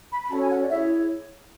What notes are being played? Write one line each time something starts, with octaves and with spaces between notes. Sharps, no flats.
B5
B5
C#4 F#4 A4 C#5 A5
G#5
F#5
D5
E4 G#4 C#5 E5